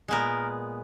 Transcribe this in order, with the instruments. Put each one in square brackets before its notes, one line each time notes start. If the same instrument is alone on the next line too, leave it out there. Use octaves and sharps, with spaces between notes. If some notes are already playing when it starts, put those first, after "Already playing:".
[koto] A#2 G#3 B3 A#4